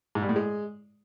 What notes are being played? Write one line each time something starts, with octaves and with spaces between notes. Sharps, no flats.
G#2
G2
A2
G#3